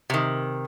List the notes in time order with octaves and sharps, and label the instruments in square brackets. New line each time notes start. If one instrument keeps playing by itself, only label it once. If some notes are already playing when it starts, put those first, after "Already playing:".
[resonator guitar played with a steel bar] C3 D#3